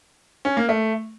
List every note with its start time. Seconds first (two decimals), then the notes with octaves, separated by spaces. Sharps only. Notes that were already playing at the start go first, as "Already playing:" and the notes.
0.45 C#4
0.57 A#3
0.69 A3